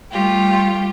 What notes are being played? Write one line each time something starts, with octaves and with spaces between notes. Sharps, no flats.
G3 A3 F4 G4